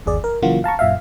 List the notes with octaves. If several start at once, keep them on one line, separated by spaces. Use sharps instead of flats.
G1 D#2 G#4 D5
A#4
C#3 E3 F#3 A#3 F4 F#4
F5 A5 A#5 C#6
F#2 A#2 E5 F5